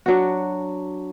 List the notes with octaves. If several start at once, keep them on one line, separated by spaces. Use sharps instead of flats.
F#3 D4 F#4